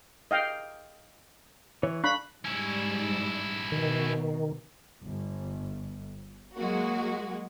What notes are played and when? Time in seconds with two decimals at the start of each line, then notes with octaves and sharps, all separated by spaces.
0.31 D#5 F5 G5
1.83 E3 C#5
2.04 D4 F5 B5 C#6 F#6
2.45 G#2 G3 C#4 E4
3.72 B2 D#3
5.03 G1
6.56 F#3 G#3 A#3 F#4